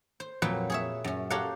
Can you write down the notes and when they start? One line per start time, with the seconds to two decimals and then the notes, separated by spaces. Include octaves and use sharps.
0.20 C5
0.42 F2 A#2 F#3 B4 G5
0.70 G#4 C#5 E5
1.04 F#2 C#4
1.30 G4 A4 A#4 C#5 F5 F#5